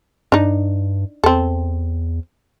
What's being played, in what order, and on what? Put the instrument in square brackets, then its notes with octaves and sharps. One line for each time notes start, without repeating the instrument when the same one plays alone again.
[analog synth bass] G2 [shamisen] D4 D#4
[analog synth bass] E2 [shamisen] C4 A4